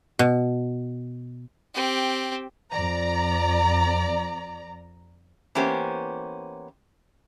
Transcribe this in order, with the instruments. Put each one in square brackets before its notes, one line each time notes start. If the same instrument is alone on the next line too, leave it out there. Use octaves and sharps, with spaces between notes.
[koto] B2
[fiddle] C4 G4
[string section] F2 D5 A#5
[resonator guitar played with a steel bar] E3 A#3 B3 C#4 G4 C5